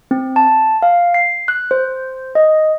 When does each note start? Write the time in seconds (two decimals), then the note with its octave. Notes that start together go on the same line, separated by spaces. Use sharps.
0.11 C4
0.36 A5
0.82 F5
1.14 C7
1.48 F#6
1.71 C5
2.35 D#5